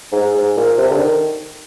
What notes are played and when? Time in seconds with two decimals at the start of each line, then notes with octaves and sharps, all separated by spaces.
0.12 G#2
0.34 G#2
0.57 A#2
0.78 C3
0.91 D3
1.00 D#3